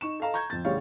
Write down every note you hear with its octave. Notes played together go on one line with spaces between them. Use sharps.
D#4 C#6 E7
A4 D#5 F5 A#5
A#5 C#6 G6 G#6
F2 A6
A1 C#3 G3 C#5 F5 C#6